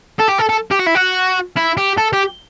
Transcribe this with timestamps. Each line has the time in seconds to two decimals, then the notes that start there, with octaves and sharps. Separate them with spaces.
0.19 A4
0.29 G4
0.39 A4
0.49 A4
0.71 G4
0.79 F#4
0.86 E4
0.95 F#4
1.56 E4
1.77 G4
1.98 A4
2.13 G4